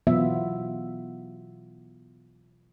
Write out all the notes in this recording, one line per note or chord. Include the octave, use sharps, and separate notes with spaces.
B2 E3 F#3 B3 F4 E5